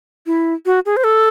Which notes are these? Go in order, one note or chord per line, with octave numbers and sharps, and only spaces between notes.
E4
F#4
G#4
C5
A4